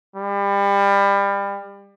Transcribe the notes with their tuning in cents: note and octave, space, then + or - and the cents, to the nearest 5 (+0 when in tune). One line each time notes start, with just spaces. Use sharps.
G3 +30